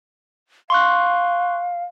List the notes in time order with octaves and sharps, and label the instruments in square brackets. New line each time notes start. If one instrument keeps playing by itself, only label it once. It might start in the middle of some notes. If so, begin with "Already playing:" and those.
[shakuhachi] F5 [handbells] C6 C#6 F#6